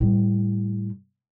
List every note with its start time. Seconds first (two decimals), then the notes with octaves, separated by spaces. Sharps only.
0.01 A2 G3